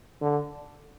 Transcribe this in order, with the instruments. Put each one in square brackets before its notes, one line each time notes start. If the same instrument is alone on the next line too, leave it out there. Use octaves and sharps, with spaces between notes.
[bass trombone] D3